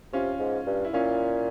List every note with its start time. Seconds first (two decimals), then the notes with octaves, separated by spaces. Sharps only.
0.13 C3 C#4 F4
0.40 G#2
0.67 G2
0.84 E4
0.94 A#2 C#4 F4